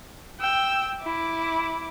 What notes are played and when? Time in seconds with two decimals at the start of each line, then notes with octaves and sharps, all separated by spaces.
0.40 G5 E6
1.03 E4 D6